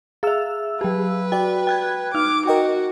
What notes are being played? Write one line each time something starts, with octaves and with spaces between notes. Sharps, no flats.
G#4 E5 F5 E6
F#3 G4 B4
F#4 D5 G5
G5 F#6 G#6
D#4 D6 F6
F#4 A#4 D#5 G5